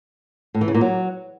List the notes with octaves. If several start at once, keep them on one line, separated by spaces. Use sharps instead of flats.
A2
E3
C#3
A#2
F#3